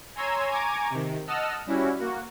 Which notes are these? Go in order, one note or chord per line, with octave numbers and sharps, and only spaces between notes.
C#5 G#5 A#5 C6 E6 G#6
G#5 A#5 C#6 D6 G#6
C3 D#3
D#5 F#5 A5 E6 F6
G3 C#4 E4 F#4
A#3 F#4